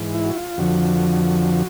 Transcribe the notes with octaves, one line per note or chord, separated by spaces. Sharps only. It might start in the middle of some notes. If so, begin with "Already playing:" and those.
Already playing: G#2 E3
E4
F#4
F4
F2 D3 F3 F#4